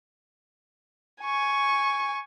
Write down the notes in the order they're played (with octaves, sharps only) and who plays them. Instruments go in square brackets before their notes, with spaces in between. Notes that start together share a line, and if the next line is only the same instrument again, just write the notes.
[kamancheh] G#5 C#6